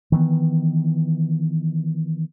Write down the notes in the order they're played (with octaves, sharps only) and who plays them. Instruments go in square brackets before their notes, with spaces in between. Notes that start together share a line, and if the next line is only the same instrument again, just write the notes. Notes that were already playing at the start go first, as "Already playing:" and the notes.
[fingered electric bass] D#3 E3 B3